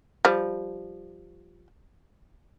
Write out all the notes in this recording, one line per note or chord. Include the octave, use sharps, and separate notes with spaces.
F3 G3